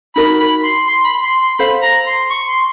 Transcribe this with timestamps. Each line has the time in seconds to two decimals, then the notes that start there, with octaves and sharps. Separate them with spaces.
0.16 D#4 F#4 A#4 B5
0.40 B5
0.64 C6
0.87 C6
1.04 B5
1.22 C6
1.40 C6
1.58 A4 C5 F5 B5
1.82 A#5
2.07 C6
2.30 C#6
2.48 C6